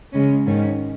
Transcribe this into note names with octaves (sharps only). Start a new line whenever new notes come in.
C#3 G#3 C#4
G#2 D#3 G#3 C#4